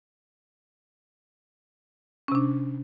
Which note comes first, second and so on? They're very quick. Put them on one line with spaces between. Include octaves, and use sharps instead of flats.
C#4 C3 D4